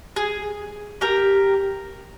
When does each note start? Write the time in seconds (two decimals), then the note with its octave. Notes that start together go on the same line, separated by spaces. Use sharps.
0.16 G#4
1.01 G4 A#4